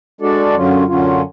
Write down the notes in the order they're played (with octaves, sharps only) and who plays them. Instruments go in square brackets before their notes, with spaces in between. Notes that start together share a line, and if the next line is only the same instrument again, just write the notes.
[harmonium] G#3 D4 F#4 A4 D5
F#2 D3 F#3 C#4 F4
F#2 D3 F#3 C#4 F4